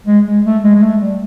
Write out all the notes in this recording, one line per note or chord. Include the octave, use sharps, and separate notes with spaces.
G#3
G#3
A3
G#3
G#3
A3
G3